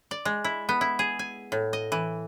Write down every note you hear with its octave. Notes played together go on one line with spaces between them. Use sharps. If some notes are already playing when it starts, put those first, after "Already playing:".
D5
G#3
E4
B3
E4
G#4
G#5
A2
D#5
E3